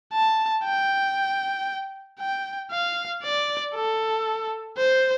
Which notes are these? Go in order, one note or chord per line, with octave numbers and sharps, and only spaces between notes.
A5
G5
G5
F5
D5
A4
C5